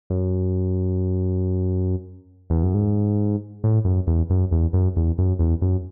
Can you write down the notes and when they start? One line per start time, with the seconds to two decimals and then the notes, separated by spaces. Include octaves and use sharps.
0.10 F#2
2.50 E2
2.63 F#2
2.74 G#2
3.64 A2
3.85 F#2
4.07 E2
4.30 F#2
4.51 E2
4.73 F#2
4.96 E2
5.18 F#2
5.39 E2
5.62 F#2